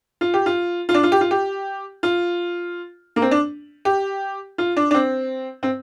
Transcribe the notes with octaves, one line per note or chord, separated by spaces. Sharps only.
F4
G4
F4
F4
D4
F4
G4
F4
G4
F4
A#3
C4
D4
G4
F4
D4
D4
C4
C4